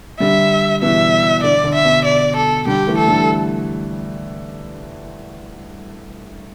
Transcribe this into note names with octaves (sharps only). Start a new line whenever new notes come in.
D3 G3 E5
B2 E3 E5
D3 D5
D3
E5
B2
D5
A4
D3 G3 G4
E3 A3
A4
D3 G3